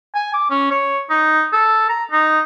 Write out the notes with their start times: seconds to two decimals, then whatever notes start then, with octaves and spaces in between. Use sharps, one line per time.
0.15 G#5
0.34 D6
0.50 C#4
0.71 C#5
1.10 D#4
1.53 A4
1.89 A#5
2.11 D#4